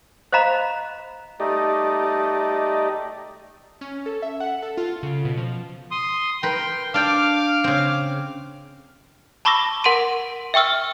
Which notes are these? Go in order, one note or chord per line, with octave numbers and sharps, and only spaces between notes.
C5 D#5 F5 A#5 B5
A3 D#4 G4 D5 D#5
C#4
A4
E5
F#5
A4
F4
C#3
B2
F3
C6 D#6
A#4 B4 G5 C6
D4 D5 F5 G5 D6 F6
C#3 C4
A5 B5 C#6 D6 E6 A#6
A#4 F#5 C6 D7 D#7
E5 G5 C#6 E6 F6